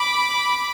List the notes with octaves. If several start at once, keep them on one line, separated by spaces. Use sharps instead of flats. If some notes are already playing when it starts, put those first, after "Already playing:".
Already playing: B5 D6